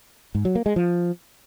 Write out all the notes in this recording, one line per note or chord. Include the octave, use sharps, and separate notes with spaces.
G#2
F#3
A#3
G#3
F3